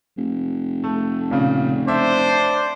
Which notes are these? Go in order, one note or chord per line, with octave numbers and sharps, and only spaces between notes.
F1
A3
A#2 C#3
D4 C5 E5